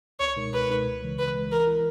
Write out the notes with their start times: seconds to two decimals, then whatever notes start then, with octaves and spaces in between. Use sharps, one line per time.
0.20 C#2 C#5
0.36 B2 G#3 D#4 A#4
0.52 C#2 B4
0.69 B2 G#3 D#4 A#4
0.86 C#2
1.02 C#3 E3 G#3
1.18 C#2 B4
1.34 C#3 E3 G#3
1.52 E3 A#4
1.67 B3 E4